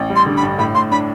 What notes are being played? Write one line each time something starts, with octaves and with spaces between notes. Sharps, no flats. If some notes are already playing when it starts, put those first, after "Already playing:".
Already playing: A1
G3
C6
D3
B5
G2
A2 B5
A2 C6
D4 B5